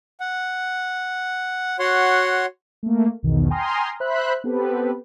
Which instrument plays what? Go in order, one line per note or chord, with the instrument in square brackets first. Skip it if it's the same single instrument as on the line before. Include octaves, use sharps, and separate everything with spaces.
[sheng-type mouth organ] F#5
F#4 C#5 F#5 C6
[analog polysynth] A3 A#3
B1 E2 B2 D#3
G5 G#5 A#5 C6 D#6 F6
C5 E5 B5 F#6
B3 C4 G4 A4 B4